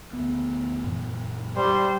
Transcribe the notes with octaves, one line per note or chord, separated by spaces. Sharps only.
D2 B3
F#2 A#2 E3
G3 C5